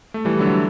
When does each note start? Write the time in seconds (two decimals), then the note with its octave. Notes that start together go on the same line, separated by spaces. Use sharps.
0.14 A3
0.25 E3 G3
0.39 D3 F#3